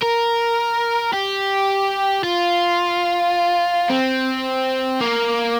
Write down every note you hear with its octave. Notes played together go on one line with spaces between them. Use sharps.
A#4
G4
F4
C4
A#3